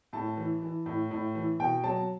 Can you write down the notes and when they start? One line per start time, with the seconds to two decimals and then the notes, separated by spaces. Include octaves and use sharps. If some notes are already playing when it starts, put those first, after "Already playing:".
0.13 A2 A5
0.37 E3
0.62 E3
0.86 A2
1.11 A2
1.35 E3
1.60 B2 G5
1.84 F#3 A5